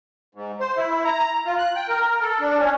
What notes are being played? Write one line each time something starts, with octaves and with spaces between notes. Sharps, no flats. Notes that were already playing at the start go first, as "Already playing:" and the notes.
G#2
C5
E4
A#5
F4
F#6
G5
A#4
A4
D4
C#4